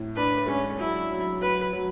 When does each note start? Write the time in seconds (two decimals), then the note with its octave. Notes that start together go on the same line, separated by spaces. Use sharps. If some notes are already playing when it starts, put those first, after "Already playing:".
Already playing: A2
0.16 D4 B4
0.48 G#3 C#4
0.79 F#3 E4
1.10 F#3
1.41 F#3 B4
1.73 F#3